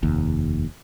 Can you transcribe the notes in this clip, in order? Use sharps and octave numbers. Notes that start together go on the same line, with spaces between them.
F1 D#2